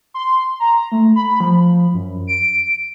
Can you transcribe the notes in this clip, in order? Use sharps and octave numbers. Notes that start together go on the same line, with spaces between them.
C6
A#5
A3
B5
F3
F#2
D7